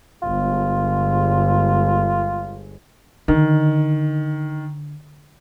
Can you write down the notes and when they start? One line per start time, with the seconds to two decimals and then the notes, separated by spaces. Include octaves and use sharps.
0.23 G1 G#3 F4
3.28 D3 D#3